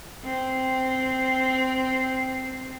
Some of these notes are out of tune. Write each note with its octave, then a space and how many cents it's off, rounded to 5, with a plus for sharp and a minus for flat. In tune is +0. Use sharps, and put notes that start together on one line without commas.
C4 -10